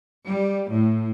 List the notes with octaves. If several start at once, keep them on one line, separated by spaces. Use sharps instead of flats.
G3
A2